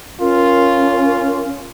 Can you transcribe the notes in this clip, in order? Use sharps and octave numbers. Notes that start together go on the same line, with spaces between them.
C#4 F4 A#4